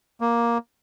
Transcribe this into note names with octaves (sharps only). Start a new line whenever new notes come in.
A#3